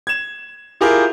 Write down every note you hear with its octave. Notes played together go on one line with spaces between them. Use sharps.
G#6 E7
E4 F4 G4 G#4 A#4